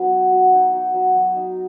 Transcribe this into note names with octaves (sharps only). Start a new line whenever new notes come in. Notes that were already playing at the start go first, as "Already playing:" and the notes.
Already playing: F#3 B3 D#4
F#4
F#4
D#4
F#4
F#3
F#3
D#4